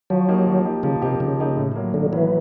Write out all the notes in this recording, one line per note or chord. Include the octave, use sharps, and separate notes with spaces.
F3 F#3
A#3 D#4 G4
F3
A#3 D#4 G4
C#3 F3
C3 A#3 D#4 G4
C#3 F3
A#3 D#4 G4
A2
F#3 A#3
A2 D3
E3 F#3 A#3